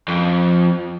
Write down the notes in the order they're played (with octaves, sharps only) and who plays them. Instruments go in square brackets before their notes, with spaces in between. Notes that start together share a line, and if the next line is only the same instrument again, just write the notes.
[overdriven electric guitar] F2